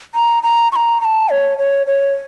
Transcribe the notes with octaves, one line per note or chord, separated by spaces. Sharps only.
A#5
A#5
C#6
A#5
A#5
A5
C#5
C#5
C#5